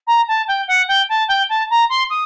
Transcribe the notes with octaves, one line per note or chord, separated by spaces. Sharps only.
A#5
A5
G5
F#5
G5
A5
G5
A5
A#5
C6
D#6